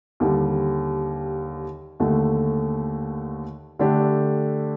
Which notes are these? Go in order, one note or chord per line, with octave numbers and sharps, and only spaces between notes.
D#2 D3 G3
D#2 D3 A3
D3 A3 D4 G4